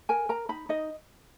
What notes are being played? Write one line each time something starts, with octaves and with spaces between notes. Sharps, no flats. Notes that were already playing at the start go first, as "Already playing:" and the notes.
A#4 G#5
A#4 A#5
D#4 B5
D#4 D#5